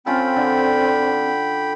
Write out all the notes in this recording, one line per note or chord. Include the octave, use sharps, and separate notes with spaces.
C4 C#4 F4 A4 G5 B5
D3